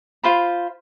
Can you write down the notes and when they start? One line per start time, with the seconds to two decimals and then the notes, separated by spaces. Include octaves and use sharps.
0.24 F4 C5 B5